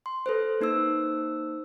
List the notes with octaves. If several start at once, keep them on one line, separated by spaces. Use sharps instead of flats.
C6
A4 B4 C5
A#3 D#4 C5 E6